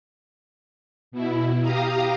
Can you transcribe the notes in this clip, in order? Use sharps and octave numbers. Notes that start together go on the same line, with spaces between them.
B2 E4
G4 F5 A#5 D#6